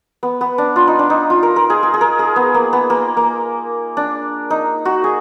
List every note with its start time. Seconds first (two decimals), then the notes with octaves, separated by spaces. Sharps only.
0.23 B3
0.41 B3
0.58 D4
0.76 F4
0.88 D#4
0.99 D4
1.10 D#4
1.30 F4
1.43 A#4
1.56 A#4
1.70 G#4
1.83 G#4
1.94 G#4
2.01 A#4
2.19 G#4
2.36 B3
2.54 A#3
2.73 B3
2.90 A#3
3.17 A#3
3.97 D4
4.50 D#4
4.85 F#4
5.04 G#4